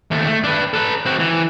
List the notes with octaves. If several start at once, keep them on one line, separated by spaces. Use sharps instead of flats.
D#2 A3
A3
D4 B4
A4 B4
C4 F#4
E3